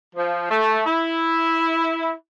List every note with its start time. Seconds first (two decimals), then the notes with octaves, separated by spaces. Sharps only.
0.15 F3
0.50 A3
0.85 E4